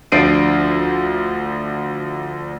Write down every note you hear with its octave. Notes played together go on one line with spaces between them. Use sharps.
D2 F3 D4 C7 D7 D#7